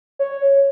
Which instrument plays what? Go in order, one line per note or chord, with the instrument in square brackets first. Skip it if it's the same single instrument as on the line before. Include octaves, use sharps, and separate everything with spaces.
[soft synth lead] C#5